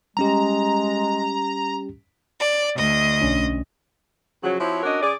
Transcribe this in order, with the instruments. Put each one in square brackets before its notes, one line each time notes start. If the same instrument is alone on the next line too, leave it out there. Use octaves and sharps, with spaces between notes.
[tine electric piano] G3 C#4 G4 [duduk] G#3 [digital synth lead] A#5
[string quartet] D5
D2 D#5
[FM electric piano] B1 C#4 D4
[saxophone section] C#3 F3 F#3
F3 C4 E4 F#4 C#5
C#4 D4 F#4 A#4 D#5
C#3 G#4 D5